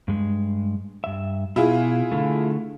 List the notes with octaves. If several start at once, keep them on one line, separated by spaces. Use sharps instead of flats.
G2 G#3
G2 E5
B2 E4 F4 G#4
D3 A3